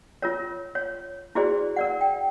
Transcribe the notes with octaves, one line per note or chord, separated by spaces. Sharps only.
F4 A#4 C#5
C#5
E4 F#4 G#4 C5 D5
A#4 D5 F#5
G5